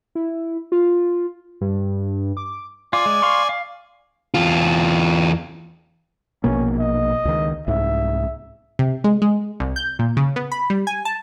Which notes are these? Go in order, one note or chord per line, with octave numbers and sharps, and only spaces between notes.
E4
F4
G2
D6
F4 D5 G#5
G#3
F5 C6 C#6
F5
E2 F4
A#1 B2 A#3 C#4
D#5
C#2 D#3
C2 G#2 E5
C3
G#3
G#3
C2
G6
A#2
C#3
B3
B5
G3
G#5
A5